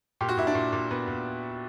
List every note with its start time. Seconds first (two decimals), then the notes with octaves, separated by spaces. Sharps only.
0.21 A#2 G4
0.29 F#4
0.37 A#2 E4
0.47 D4
0.55 A#2
0.73 A#2
0.91 A#2 B3
1.08 A#2